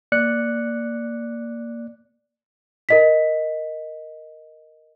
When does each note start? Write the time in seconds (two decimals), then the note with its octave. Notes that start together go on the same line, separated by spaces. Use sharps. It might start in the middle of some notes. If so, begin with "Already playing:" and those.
0.12 A#3 D5 F#6 C#7
2.89 A#4 D#5 B6